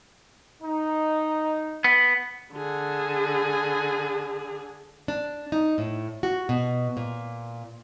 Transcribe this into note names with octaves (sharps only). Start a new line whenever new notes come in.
D#4
B3
D3 G#4
D4
D#4
A2
F#4
B2
A#2